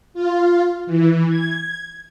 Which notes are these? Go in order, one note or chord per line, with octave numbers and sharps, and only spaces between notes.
F4
E3
G#6